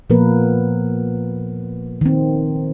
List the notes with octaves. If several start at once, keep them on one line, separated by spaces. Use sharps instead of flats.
A#2 F3 A#3 B3 A#4 B4
D#3 C4